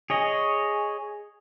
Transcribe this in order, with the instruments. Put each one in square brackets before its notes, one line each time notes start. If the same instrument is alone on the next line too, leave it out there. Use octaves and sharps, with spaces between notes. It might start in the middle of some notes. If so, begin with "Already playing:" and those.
[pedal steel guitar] G#4 C#5 D#5